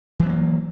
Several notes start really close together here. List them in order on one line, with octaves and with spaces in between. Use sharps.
E3 F#3 B3 A#3